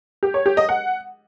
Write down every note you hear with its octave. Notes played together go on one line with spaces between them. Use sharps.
G4
C#5
G4
D#5
F#5